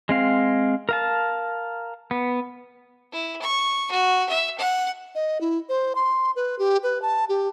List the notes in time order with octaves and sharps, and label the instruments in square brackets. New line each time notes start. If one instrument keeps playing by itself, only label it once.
[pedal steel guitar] G#3 C4 F5
A#4 F5 A5
B3
[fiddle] E4
C#6
F#4
E5
F#5
[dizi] D#5
E4
C5
C6
B4
G4
B4
A5
G4